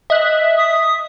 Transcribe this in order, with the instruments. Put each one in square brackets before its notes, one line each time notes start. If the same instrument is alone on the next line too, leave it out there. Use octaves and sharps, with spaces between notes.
[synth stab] D#5 F#6 [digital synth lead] E5
[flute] D#6